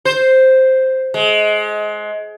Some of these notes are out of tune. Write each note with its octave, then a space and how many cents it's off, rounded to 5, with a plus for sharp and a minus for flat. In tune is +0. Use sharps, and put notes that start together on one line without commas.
C5 +0
G#3 +25